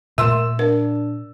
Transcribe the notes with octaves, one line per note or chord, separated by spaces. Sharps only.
A#2 A3 A#4 E5 C6 E6 E7
D4 A#4